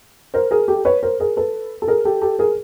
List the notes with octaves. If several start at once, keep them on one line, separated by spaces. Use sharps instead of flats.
A#4 C5
G#4 A#4
G4 A4
B4 C#5
A#4 C5
G#4 A#4
A4 B4
A4
G#4 A#4
G4 A4
G4 A4
G#4 A#4